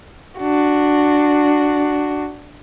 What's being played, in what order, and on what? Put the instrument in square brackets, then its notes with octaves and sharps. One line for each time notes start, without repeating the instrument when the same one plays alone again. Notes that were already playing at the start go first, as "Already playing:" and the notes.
[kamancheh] D4 F#4